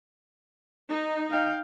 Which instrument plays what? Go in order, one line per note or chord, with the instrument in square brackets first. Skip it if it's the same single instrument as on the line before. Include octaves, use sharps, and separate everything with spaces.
[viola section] D#4
[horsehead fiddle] F5 G5